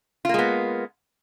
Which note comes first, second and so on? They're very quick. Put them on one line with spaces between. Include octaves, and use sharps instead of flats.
F4 A#3 G#3 B3